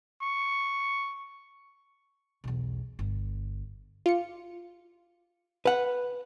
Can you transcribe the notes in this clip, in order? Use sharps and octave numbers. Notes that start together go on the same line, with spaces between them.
C#6
B1 E2
G1
F4 D6 C#7
B4 F#5